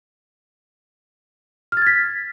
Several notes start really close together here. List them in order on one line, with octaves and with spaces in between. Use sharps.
F6 A6 G#6 B6